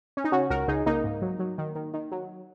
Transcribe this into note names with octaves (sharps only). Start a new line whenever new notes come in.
C#4
D#4
C#3 C#4 F#4
C#2 F#4 A#4
C#2 D#4 G#4
C#2 A#3 D#4
G#2
F#3
F#3
D#3
D#3
D#3
F#3